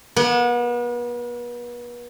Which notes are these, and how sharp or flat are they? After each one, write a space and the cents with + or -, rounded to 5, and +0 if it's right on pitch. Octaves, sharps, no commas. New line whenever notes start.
B3 -40 F#5 +15